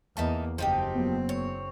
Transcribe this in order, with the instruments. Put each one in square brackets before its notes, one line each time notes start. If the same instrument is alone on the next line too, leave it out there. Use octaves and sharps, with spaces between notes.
[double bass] E2 A#3 [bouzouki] D#4 E5 A5
[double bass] F#1 C4 [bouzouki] F3 D#4 G4
[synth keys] F#3 A#3 B3
[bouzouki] C#5